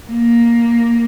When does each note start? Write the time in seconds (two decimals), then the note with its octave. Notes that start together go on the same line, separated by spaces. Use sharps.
0.10 A#3